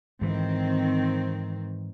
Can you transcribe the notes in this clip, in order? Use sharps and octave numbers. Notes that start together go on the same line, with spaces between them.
G#2 D#3 E3 C4